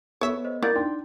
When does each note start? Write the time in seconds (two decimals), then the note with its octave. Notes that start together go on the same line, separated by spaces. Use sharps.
0.21 B3 A4 B4 C#5 E5
0.45 C5 D#5
0.62 A#3 E4 A#4 D5 F#5 G6 A6
0.76 D4 D#4 G5 C6